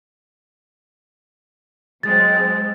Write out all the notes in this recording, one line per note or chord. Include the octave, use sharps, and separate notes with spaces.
F#3 G#3 C4 A6